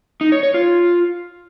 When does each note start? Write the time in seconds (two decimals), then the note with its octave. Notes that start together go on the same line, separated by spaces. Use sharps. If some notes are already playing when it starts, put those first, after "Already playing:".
0.21 D#4
0.32 C#5
0.43 C#5
0.54 F4